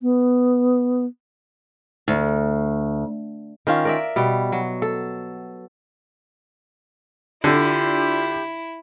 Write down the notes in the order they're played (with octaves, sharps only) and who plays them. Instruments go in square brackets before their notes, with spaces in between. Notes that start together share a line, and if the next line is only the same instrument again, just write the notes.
[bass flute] B3
[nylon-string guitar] D2
[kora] D#3 C#4 F4
A#4 D5 E5
B2 G3
F#3
A4
[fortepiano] D3 [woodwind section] D4 F4 [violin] E4 [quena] G4